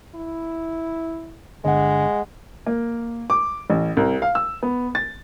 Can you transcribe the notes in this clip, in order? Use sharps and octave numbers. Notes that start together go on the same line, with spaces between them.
E4
G1 D3 G#3 D#5 F#5
A#3
D6
A1
C2
F5
E6
B3
A6